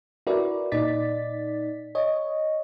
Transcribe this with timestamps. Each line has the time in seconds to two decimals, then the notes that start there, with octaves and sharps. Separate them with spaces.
0.27 E4 F#4 A#4 B4 D5
0.72 A#2 D#4 D5 A6 B6
1.95 C#5 D#5